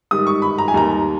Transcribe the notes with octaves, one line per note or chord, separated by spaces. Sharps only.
G#2 D#3 G3 D#6
C#6
B5
A#5
G#5
D#2 D#3 G3 A#5